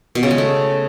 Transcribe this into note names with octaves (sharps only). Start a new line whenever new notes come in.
B2
C#3
G#3
A3